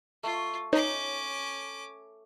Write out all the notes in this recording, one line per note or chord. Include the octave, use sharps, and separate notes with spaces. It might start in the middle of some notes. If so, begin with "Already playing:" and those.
A3 F4
C#4 D#4 C#5 D6